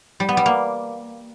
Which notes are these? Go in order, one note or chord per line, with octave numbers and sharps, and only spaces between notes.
G3
B3
G3
A#3